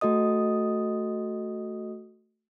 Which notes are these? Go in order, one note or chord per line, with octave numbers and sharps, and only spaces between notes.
A3 F#4 A4 D#5 D#6